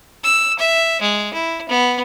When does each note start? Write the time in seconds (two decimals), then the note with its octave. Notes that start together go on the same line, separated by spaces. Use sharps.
0.24 E6
0.59 E5
1.01 G#3
1.33 E4
1.69 B3